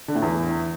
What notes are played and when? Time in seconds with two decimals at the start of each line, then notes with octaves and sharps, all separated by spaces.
0.08 D3
0.15 A2
0.22 E2